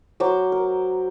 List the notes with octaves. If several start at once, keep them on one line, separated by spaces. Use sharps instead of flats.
F#3 C5 D6
A#4